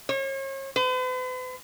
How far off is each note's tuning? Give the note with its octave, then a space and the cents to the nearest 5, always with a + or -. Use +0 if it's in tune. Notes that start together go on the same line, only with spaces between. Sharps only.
C#5 -40
B4 +45